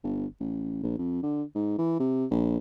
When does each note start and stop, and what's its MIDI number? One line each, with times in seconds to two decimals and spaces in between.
0.04 0.26 31
0.40 0.82 33
0.83 0.96 34
0.98 1.20 41
1.23 1.43 50
1.55 1.75 44
1.78 1.99 52
2.00 2.25 48
2.31 2.58 34